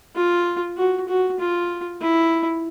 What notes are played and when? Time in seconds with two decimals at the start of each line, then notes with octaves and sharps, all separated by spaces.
0.15 F4
0.77 F#4
1.09 F#4
1.39 F4
2.01 E4